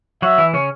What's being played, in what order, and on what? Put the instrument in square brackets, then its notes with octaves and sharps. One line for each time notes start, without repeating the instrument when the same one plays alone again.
[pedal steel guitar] F#3 F#4 [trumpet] E5
[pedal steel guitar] E3 E4
C#3 C#4